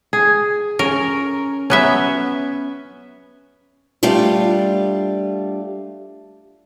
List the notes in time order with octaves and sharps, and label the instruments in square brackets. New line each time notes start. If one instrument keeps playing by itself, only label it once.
[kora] G#4
[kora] C#4 [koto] A#4
[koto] F#3 B3 E5 [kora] C#4
[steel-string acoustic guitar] G3 A3 D4 F4